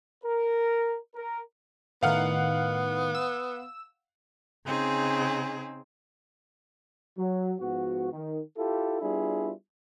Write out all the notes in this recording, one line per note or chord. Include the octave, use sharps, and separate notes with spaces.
A#4
A#4
A2 D#3 B3 F5 F#5 F6
E6
C#3 C4 D#4 G#4
F#3
G#2 F3 B3 F#4
D#3
E4 F4 G4 A4
G3 B3 D4 E4 F4 G#4